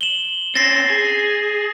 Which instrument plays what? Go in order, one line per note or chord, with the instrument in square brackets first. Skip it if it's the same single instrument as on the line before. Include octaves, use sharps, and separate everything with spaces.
[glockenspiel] E7 F#7 G7
[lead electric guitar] C4 C#4 [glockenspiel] A6 A#6 C7
[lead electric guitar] G#4